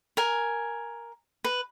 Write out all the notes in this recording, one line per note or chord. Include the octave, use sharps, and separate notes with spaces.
A#4 G#5
B4